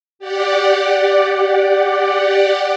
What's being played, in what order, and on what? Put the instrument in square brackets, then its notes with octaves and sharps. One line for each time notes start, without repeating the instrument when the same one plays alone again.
[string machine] G4 D5 F#5